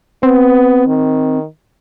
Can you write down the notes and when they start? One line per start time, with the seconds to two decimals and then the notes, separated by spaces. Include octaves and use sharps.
0.23 B3 C4
0.87 D#3